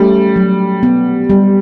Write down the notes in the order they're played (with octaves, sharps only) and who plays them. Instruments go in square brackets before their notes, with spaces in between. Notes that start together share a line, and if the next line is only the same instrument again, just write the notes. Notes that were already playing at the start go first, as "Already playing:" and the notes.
Already playing: [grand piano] G3 [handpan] A3 C#4
[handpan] F#3
B3
G3